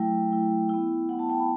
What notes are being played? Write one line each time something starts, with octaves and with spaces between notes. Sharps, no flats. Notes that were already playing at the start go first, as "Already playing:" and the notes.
Already playing: F#3 A3 E4 G5
F#3 A3 E4
B3 E4
B3 E4 F#5
A5
G5
B5